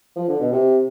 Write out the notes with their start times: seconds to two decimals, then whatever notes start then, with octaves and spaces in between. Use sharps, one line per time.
0.16 F3
0.28 D3
0.40 B2
0.52 C3